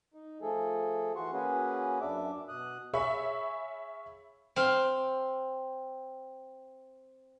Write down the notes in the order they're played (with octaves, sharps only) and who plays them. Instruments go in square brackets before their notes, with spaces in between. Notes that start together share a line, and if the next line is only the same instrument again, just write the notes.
[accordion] D#4
F3 A3 G#4 A4
E3 F#4 C6 C#6
A#3 C#4 F#4 G#4 B4
F#2 D4 E5 D6
B2 D#6 F#6
[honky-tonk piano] G#4 C#5 E5 F5 B5 C#6
[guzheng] C4 F5